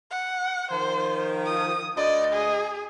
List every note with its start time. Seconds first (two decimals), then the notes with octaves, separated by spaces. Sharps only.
0.10 F#5
0.71 D#3 F3 C5
1.45 D#6
1.97 D2 D5 D#5
2.32 G#4